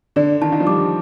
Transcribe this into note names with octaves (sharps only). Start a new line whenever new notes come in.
D3 D5
D#3 A5
D#3
F3
G3 D6